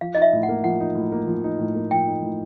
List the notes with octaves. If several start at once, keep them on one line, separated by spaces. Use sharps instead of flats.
F3 F5
D#4 D#5
E5
A2
F#5
A#3
F3 F#5
D#4
A2
A#3
F3
D#4
A2
A#3
F3 G5
D#4
A2